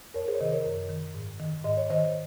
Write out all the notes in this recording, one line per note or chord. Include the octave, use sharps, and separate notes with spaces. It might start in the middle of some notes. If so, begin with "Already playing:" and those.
F2 A#4 C#5
G#4 C5
C#5
C3 D#3 C5 D#5
A#4 C#5
F#2
D#3
G#2
D#3
G#2 D#5
C#5
D#3 C5 D#5